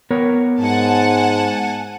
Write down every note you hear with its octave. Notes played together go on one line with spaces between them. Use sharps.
B3 A#4 C#5
G#2 F#5 G#5 A5